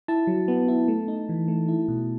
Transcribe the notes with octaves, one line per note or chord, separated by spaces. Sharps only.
E4 A5
F#3
B3
E4
A3
D#4
E3
A3
E4
B2